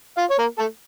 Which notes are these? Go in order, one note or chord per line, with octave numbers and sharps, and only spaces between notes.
F4 F5
C#5
A#3 A#4
A3 A4